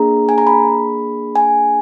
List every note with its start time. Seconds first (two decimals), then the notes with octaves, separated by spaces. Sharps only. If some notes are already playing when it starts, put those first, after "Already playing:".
Already playing: A#3 D4 G#4 A#5
0.29 G#5
0.38 A#5
0.47 B5
1.35 G#5